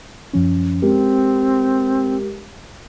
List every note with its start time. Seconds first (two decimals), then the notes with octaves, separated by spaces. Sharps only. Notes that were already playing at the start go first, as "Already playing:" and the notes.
0.33 F#2 F3 C#4
0.82 G#3 C4 G4 A#4